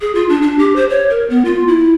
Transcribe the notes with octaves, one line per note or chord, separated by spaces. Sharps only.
G#4
F4
D4
D4
G4
C5
C#5
A#4
B3
F4
E4